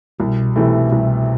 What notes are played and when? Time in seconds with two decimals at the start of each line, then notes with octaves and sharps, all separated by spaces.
0.20 C2 B2
0.56 C3 E3 A3
0.92 C2